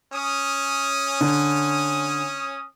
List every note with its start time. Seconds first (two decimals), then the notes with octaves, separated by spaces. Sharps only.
0.12 C#4 D#6
1.21 D3